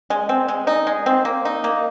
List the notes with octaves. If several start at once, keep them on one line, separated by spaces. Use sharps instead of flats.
G#3
C4
G#3
D#4
G#3
C4
A#3
D#4
A#3